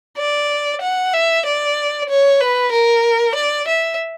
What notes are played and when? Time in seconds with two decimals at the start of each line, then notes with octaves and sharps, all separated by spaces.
0.17 D5
0.81 F#5
1.13 E5
1.46 D5
2.09 C#5
2.41 B4
2.72 A#4
3.35 D5
3.68 E5